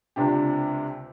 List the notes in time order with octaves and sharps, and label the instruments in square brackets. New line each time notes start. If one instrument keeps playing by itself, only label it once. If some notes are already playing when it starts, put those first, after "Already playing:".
[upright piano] C#2 C3 D4 G4